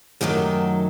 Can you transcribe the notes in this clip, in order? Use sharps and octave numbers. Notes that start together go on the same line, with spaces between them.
F#2 D#3 F#3 A3 G4